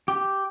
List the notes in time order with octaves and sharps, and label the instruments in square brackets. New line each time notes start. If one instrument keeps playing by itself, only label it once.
[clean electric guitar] G4